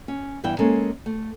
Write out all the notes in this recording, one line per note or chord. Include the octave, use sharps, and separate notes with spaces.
C#4
E2 G2 E3 E4 G5
G#3 A#3 C#4 A4
A3